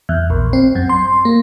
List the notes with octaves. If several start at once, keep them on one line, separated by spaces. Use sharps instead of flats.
E2
A#1
C4
F#2
C6
A#3